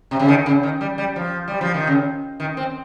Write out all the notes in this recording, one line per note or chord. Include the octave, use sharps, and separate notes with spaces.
C3
C#3
D#3
C#3
D#3
G3
G3
F3
G3
F3
D#3
C#3
D#3
C4